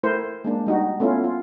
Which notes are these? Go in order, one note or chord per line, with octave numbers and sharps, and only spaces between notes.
A3 E4 A#4 C5
G#3 A#3 D4
G3 D#4 F#4
A3 B3 C#4 E4 F4
F4